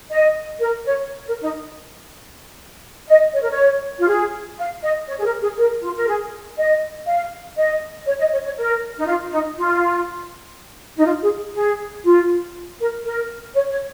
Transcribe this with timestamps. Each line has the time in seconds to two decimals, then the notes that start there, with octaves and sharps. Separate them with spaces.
0.10 D#5
0.60 A#4
0.85 C#5
1.26 A#4
1.42 D#4
3.08 D#5
3.33 C#5
3.42 A#4
3.50 C#5
3.98 F4
4.08 G#4
4.58 F5
4.83 D#5
5.08 C#5
5.18 G#4
5.24 A#4
5.41 G#4
5.58 A#4
5.82 F4
5.96 A#4
6.07 G#4
6.57 D#5
7.07 F5
7.57 D#5
8.06 C#5
8.19 D#5
8.32 C#5
8.44 C#5
8.56 A#4
8.99 D#4
9.06 F4
9.30 D#4
9.56 F4
10.97 D#4
11.05 F4
11.22 G#4
11.54 G#4
12.05 F4
12.80 A#4
13.04 A#4
13.54 C#5
13.70 C#5